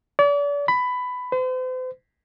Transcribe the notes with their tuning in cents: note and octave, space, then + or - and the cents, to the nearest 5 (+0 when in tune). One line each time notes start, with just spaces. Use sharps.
D5 -40
B5 +15
C5 -45